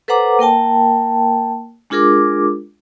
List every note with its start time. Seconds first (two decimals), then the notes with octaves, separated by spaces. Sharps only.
0.08 A4 B4 C5 F#5 A#5 D6
0.39 A#3 A#4 G5 A5
1.90 G#3 D4 F4 G#4 A#4 D6